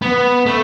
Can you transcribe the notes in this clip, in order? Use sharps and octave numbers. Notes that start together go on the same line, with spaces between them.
B3
A3